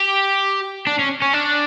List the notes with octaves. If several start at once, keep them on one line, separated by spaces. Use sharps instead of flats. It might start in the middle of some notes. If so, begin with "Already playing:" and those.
Already playing: G4
D4
C#4
C#4
D4